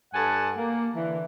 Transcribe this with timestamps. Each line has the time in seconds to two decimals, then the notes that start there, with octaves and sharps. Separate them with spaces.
0.13 G2 A4 F#5 G#5 A5
0.57 A#3
0.95 D3 E3